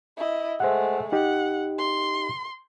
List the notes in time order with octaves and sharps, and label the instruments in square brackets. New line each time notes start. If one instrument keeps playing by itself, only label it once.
[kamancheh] E4 D#5
[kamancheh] G#3 A3 [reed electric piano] C5 E5 F#5
[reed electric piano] D#4 G4 D#5 [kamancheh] F#5
[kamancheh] C6